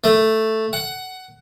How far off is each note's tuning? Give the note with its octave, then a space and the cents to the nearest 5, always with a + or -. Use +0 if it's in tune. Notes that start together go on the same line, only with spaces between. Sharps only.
A3 +5
F#5 +15